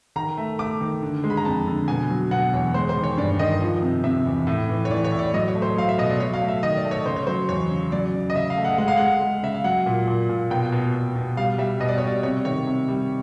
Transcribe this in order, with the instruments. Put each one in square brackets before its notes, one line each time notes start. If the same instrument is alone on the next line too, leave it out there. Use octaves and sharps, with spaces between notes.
[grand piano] D#3 A#5
A3
A3 D6
D#3
D3
G#3
B5
A#5
F2 A5
D3
B2 G#5
F#3
B2 F#5
E2 C#5
G#3 C5
C5
D#3
C#5
G2 D5
D#3 D#5
F3
C3
C3 E5
E2
A2
E3
C#5
E3 D5
C#5
A2
D5
F#3 D#5
C#5
A3
C5
F#3 F5
E5
B2 D#5
D5
F#3 C#5
F5
A3
E5
D#3 D#5
D5
A3
C#5
C#3 C5
C#5
F#3 C5
E2 C#5
C#3
F#3 D5
C#3
D#5
C#3 E5
F5
A3
F#5
G#3 F#5
F5
G#3 F#5
G#3
C#3 E5
F5
F#3 F#5
A#2
A#2
A#2
B2 G5
B2
B2
B2
G3 F5
G3 E5
B2 D#5
D5
G3 C#5
D5
C3 C#5
D#3 C#5
C3
G3